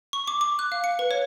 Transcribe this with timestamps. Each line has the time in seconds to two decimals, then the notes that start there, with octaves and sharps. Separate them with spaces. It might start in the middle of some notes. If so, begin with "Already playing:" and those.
0.13 C#6
0.27 D6
0.41 D6
0.59 F#6
0.72 F5
0.84 C#7
0.99 B4
1.11 C#5